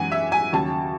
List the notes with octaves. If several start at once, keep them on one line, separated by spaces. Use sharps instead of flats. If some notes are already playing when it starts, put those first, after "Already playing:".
Already playing: F#2 E3 G#3 F#5 G#5
E5
G#5
D#2 C#3 F#3 A5